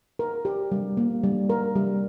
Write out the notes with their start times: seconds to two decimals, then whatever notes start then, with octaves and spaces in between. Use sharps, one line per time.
0.19 A#4
0.45 G4
0.72 G3
0.97 A#3
1.23 G3
1.50 A#4
1.76 G3